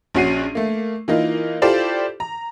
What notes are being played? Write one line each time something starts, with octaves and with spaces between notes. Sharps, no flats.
A#1 C#4 F#4 C7 D#7
A3 A#3
E3 A#3 D#4 F4
E4 F4 G4 A4 C5 D5
A#5